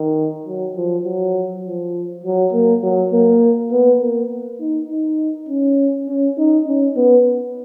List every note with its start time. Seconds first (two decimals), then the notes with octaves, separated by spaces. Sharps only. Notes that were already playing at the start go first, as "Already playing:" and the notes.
Already playing: D#3
0.46 F#3
0.76 F3
1.05 F#3
1.64 F3
2.24 F#3
2.53 A#3
2.83 F#3
3.12 A#3
3.71 B3
4.00 A#3
4.60 D#4
4.90 D#4
5.49 C#4
6.08 C#4
6.38 D#4
6.67 C#4
6.96 B3